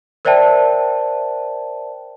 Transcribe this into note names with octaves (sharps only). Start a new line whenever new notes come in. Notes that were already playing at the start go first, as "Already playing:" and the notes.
A#4 C5 D5 E5 G5 A5